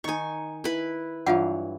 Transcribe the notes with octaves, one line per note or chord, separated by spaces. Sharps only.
D#3 D#4 G#5 C#6
E4 B4
G2 E3 F#3 F4 F#5